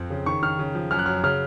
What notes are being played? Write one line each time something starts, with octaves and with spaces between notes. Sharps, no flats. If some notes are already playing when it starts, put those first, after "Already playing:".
Already playing: F2 C4
C#3
D#3 C#6
D#3 F6
C#3
F3
F#2 F6
F#6
F#3 F6
C#3 F6